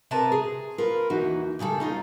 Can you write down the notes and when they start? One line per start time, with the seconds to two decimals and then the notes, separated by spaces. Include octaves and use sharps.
0.11 C3 A#4 B4 A5 A#5
0.32 G#4
0.78 F4 A#4 B4
1.10 D#2 E3 D#4 F#4
1.59 A#2 C#3 G3 A4
1.80 C#4 D#4 F4